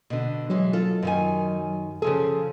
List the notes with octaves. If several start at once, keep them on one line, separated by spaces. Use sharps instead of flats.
B2 D3
E3 F#3 G#3
F4 A4
F#2 D#3 G#5
C#3 F3 G#4 A4